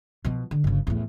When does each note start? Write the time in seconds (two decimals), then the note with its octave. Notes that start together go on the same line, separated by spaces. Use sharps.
0.25 B2 F3
0.51 D3
0.64 G1 C#3
0.87 E2 A2